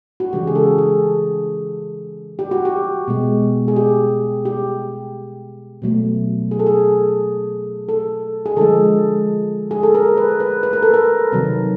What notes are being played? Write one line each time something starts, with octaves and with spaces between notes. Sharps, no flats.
F#4
C#3 E3 G#3 G4
G#4
A4
G#4
G4
F#4
G4
B2 G#3
G#4
G4
G4
B2 F#3 A3
G#4
A4
G#4
A4
G#4
D3 F3 G#3 A4
G#4
A4
A#4
B4
B4
B4
A#4
A4
A#4
C3 D#3 F#3